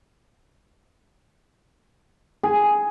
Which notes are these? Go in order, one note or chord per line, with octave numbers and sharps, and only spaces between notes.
G#4